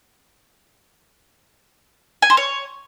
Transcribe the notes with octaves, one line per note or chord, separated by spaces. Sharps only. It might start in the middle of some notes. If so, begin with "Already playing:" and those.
G#5
C5
C#5